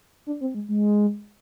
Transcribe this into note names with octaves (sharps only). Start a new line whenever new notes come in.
D4
C4
G#3
G#3